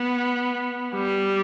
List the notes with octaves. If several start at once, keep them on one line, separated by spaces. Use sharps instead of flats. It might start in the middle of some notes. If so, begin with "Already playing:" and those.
Already playing: B3
G3